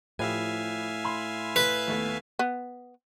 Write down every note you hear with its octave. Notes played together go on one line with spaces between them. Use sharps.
A2 F3 G4 B4 E5 F5 G#5
B5 C6
B4
D#2 A3 B3
B3